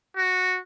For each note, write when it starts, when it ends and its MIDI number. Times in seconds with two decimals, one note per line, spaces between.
0.17 0.58 66